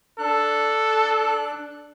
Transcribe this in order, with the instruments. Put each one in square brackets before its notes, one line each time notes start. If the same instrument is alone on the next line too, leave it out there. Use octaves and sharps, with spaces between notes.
[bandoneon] D4 F#6 [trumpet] A4